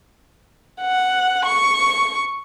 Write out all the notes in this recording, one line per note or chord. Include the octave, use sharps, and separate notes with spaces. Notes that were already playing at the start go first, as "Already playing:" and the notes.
F#5
C#6